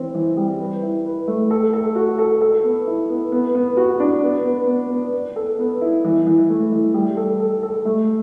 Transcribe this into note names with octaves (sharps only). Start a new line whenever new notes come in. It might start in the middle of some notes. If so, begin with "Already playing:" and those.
Already playing: E3 C4
E3
G3
B4
E4
B4
A3
A4
A4
F#4
A4
A4
B3
E4
B3
B3
B3
F#4
D4
B3
B3
B3
B3
B3
A4
B3
E4
E3
E3
A3
E3
G3
A4
A4
A4
A3